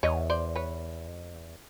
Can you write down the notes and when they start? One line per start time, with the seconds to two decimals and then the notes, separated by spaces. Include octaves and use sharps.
0.03 E2 C#5 D#5
0.30 C5 D5
0.56 B4 C#5
1.08 F2
1.34 E2